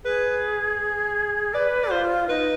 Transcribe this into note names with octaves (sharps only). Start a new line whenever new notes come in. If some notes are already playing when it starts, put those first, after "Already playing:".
G#4 B4
B4 D5
D5
F4 C5
D#4 B4